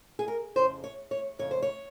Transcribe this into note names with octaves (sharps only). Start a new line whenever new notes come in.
G#4
A#4
F2 C#3 C5
C#5
C#5
F2 C#3 C#5
C5
C#5